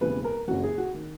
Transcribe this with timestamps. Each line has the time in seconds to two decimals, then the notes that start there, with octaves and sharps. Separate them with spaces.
0.01 E1 D#2 C#3 E3 B4
0.24 A#4
0.47 F#1 F#2 C#3 E3 F#4
0.63 G#4
0.78 F#4
0.94 D#3